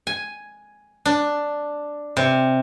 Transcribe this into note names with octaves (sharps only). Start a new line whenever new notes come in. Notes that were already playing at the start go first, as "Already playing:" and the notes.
G#5
D4
C3